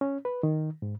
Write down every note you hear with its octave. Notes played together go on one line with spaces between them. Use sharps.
C#4
B4
D#3
G#2